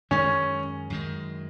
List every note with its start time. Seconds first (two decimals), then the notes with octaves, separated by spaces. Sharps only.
0.11 F#2 D#3 G#3 C#4
0.90 F#2 D#3 G#3